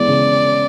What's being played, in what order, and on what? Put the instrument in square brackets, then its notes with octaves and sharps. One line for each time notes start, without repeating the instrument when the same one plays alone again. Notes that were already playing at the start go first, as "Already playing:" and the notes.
Already playing: [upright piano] E3 G#3 B3 [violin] D5
[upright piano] C#3